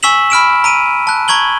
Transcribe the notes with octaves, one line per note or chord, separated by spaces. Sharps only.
G#5 C#6 E6 B6 E7 F#7
B5 F6 D7 E7
A#5 D7 D#7
A5 F#6
A#5 C#6 G#6 F#7 G7